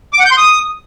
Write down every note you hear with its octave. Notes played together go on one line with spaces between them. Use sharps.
D6
F#5
G6
C6
D#6